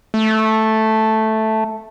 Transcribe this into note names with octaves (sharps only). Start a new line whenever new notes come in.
A3